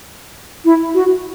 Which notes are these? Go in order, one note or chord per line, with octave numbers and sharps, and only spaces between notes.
E4
F#4